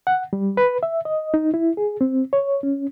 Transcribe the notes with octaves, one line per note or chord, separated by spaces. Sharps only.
F#5
G3
B4
E5
D#5
D#4
E4
G#4
C4
C#5
C#4